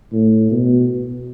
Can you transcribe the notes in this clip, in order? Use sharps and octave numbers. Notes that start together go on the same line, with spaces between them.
A2
B2